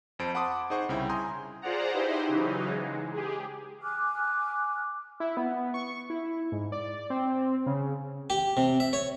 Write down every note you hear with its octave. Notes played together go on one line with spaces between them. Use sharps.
F2 C5 A5 D7
F#5 A5 B5 C6 D6 D#6
D#4 G#4 C5 F#5 C#6
C2 C#3 E4 G5
G#5 A#5 C6 D#6 G6
F4 G#4 C5 D5 F#5 A#5
D#4 E4 G4 B4 C5
C#3 E3 F#3 D#4
G#3
G4 G#4
G#5 D6 F6 F#6
E4
B3
C#6
E4
G#2
D5
C4
C#3
G4
C3
E5
C#5